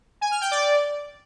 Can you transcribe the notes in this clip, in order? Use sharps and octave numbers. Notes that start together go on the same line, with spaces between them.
G#5
F6
G5
D5